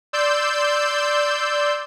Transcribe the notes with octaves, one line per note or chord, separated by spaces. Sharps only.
D5 C6 E6 G6